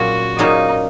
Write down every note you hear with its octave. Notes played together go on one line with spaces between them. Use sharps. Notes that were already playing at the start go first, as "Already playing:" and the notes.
Already playing: A#2 F#3 C#4 F#4 G#4
A#2 F#3 C#4 D#4 G#4